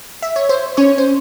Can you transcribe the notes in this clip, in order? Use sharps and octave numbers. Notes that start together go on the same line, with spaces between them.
E5
C#5
C5
C#4 C#5
C5